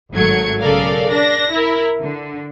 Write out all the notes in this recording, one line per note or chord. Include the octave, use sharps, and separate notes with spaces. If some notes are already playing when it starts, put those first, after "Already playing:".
G#1 F#3 A3 G#6 C#7
B1 C#3 A4 A#4 D5 F5
D4 A#6
E4 A#4
D3